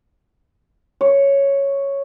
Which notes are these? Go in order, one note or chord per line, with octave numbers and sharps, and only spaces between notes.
C#5